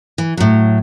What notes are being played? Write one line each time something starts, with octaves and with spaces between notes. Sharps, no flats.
E3
A2 F#3